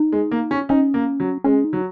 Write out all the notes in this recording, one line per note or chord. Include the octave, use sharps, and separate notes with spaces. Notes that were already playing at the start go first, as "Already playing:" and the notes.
Already playing: D#4
G#3
A#3
C#4
C#4 D#4
A#3
F#3
G#3 C#4
D#4
F#3